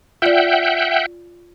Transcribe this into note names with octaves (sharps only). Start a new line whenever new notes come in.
F4 D5 E5 F#5 G5